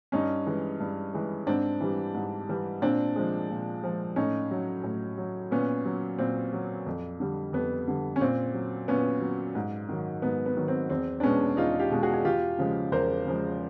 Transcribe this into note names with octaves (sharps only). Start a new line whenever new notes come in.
G2 C#4 D#4
E3 G#3
G2
E3 G#3
G#2 C4 D4
E3 G3
G#2
E3 G3
A#2 C4 D4
F3 G#3
A#2
F3 G#3
A2 C#4 D#4
F#3
A2
F#3
A#2 B3 C#4
F#3
A#2 C4
F#3
F2
D3 G3
F2 B3
D3 G3
C#4
A#2 C4
F#3
A#2 B3 C#4
F#3
G#2
D#3 F#3
G#2 B3
B3
D#3 F#3
C4
E2 C4
D4
B2 G#3 B3 C#4
E2 D#4 F4
F4 G4
B2 G#3
F#4 G#4
G#4
E2 F4 G4
C#3 F3 G#3
E2 A#4 C5
C#3 F3 G#3